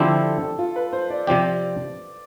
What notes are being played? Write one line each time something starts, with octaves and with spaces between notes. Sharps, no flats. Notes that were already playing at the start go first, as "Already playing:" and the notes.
Already playing: D3 F3 C4 E4 G4 A4
F4
B4
C5
D5
C3 F3 C4 G4 D5